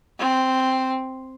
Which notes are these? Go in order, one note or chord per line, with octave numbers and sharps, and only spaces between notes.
C4